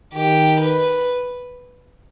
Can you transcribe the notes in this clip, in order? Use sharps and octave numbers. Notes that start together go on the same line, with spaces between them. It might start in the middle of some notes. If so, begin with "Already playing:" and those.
D#3 G4
B4